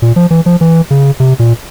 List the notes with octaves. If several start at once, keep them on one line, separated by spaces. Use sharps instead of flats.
A#2
F3
E3
F3
E3
C#3
C3
A#2